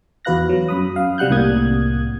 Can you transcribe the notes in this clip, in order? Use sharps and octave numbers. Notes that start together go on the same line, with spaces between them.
E2 F#4 B4 F5 F#6 A#6
F#3
F#2 B5 D#6
F5
C3 G3 F#5 F#6 G6
C2 A2 C3 A#3 D#6 G#6